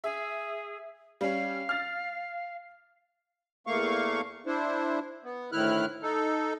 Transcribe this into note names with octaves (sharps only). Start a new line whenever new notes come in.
G#4 E5
G3 C#4 F5
F6 A6
E2 A3 A#3 F5 C#6
D4 E4 C5
B3
D2 A2 D#3 E4 F6 F#6
D#4 A4